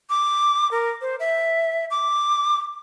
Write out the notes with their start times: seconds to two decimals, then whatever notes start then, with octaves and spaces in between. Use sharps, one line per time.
0.10 D6
0.71 A#4
1.01 C5
1.20 E5
1.91 D6